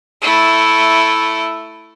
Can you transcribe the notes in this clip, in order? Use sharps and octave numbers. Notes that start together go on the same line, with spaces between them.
A3 E4